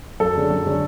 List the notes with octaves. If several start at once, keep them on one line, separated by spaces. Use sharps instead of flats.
F#2 A4
D3 G#3 C#4
F#2
D3 G#3 C#4